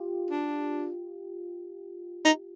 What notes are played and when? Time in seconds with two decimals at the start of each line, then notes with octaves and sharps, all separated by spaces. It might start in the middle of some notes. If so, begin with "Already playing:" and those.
Already playing: F4 G4
0.31 D4
2.25 D#4